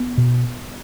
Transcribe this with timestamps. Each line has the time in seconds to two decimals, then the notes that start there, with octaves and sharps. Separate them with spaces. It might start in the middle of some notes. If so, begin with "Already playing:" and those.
Already playing: B3
0.18 B2